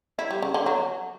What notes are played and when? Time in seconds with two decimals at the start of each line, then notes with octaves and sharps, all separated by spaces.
0.19 E4
0.31 G3
0.42 C#3
0.54 D3
0.66 F#3